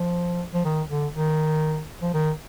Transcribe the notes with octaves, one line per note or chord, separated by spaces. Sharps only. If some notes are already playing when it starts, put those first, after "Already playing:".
Already playing: F3
F3
D#3
D3
D#3
F3
D#3